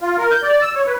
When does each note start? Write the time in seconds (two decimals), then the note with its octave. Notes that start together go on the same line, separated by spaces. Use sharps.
0.01 F4
0.18 A#4
0.31 G6
0.42 D5
0.62 E6
0.75 C#5
0.87 B4